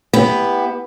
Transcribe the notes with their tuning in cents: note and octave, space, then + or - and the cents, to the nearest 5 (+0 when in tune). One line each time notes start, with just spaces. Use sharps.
B3 +0 E4 +0 G4 +20